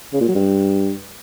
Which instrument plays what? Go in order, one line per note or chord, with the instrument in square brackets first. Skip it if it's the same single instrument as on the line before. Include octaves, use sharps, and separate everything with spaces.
[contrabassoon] C#3
A#2
F#3
G2